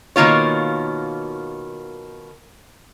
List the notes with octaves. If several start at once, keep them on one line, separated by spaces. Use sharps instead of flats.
B2 D#3 A#3 F4 C#5